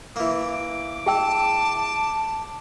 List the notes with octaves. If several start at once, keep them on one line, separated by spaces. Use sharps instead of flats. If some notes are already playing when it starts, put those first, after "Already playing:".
E3 A#3 D6
G#4 G5 A5 E6